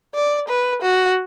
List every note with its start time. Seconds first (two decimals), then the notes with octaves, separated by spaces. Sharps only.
0.15 D5
0.48 B4
0.82 F#4